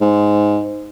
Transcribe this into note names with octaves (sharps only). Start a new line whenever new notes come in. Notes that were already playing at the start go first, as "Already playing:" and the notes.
G#2